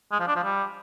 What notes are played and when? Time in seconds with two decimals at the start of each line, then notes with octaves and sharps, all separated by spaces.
0.12 G#3
0.20 F3
0.28 D4
0.36 F3
0.44 G3